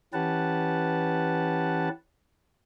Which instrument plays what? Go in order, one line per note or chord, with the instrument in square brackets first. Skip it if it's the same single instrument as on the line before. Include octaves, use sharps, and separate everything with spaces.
[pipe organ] E3 C#4 G4 B4 F#5 A5